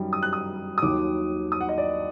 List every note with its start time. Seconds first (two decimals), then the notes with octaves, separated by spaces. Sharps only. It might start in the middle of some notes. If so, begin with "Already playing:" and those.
Already playing: F#2 D#3 G3
0.13 D#6
0.23 F#6
0.33 D#6
0.78 D#6
0.82 D#2 D#3 F#3 D6
1.52 D#6
1.61 F#5
1.69 D#5
1.78 D5